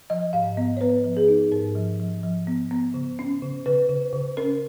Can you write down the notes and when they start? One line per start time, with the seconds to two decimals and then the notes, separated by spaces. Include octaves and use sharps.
0.10 F3 D#5
0.33 G#2 F5
0.57 B3 D#5
0.77 C#5
0.81 B3 B4
1.04 F3
1.17 G#4
1.28 D#4
1.52 G#2 A#4
1.76 F3
2.00 F3
2.23 F3
2.47 B3
2.71 B3
2.94 C#3
3.19 C#4
3.42 C#3
3.66 C#3 B4
3.89 C#3
4.13 C#3
4.37 C#4 A#4